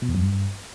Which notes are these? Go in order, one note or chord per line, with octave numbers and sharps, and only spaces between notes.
B2
E2
F#2
G2